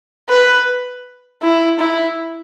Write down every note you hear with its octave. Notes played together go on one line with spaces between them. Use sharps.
B4
E4
E4